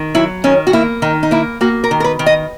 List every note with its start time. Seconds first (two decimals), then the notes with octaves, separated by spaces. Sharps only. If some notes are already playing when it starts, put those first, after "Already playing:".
Already playing: D#3
0.15 F#3 E4
0.44 D#3 C#4
0.67 F#4
0.73 A#3 E4
1.02 D#3 D#4
1.23 D#4
1.31 A#3 E4
1.61 A#3 F#4
1.84 A#4
1.91 D#3
2.00 A#4
2.04 B4
2.19 D#3
2.26 D#5